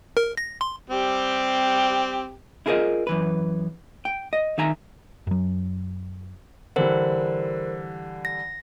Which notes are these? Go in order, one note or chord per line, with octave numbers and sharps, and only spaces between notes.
A#4
A#6
C6
G3 C4 G4
E4 F4 G#4 A#4 C5 D#5
F#2 E3 B4
G5
D#5
D#3 D#4 E5 G#5 A#5
F#2 F#3
D3 E3 G3 A#4 C5
A#6